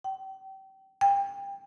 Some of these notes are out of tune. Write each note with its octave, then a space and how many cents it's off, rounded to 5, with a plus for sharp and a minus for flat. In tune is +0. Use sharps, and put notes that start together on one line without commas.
G5 -30
G5 +30